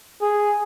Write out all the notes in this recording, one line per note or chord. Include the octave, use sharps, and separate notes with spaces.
G#4